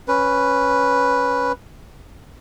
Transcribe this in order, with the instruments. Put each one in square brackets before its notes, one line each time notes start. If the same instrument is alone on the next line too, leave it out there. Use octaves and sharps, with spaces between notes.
[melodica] C#4 B4